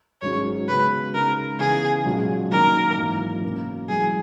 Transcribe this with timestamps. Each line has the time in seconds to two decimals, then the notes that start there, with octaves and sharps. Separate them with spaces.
0.22 G#1 G#2 F#3 C#4 G#4 C#5
0.68 C#3 G#3 B3 F#4 B4
1.13 C#3 G#3 D#4 A#4
1.59 C#3 E3 B3 G#4
2.05 B1 A#2 G#3 C#4 F#4
2.51 F#2 D#3 A#3 A#4
2.97 G#1 F#2 E3 A#3
3.43 B2 A#3 C#4
3.89 F#2 E3 G#3 G#4